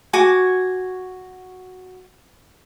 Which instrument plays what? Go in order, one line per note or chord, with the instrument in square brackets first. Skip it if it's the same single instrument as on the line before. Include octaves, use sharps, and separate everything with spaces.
[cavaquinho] F#4 G#5 D6